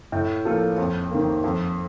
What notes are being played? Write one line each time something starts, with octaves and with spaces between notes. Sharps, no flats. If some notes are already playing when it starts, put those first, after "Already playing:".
A2
F3 A#3 F4 A4
F2
D#3 A#3
F2